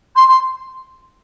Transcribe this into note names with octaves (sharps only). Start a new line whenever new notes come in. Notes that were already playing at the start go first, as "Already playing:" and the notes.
C6
C6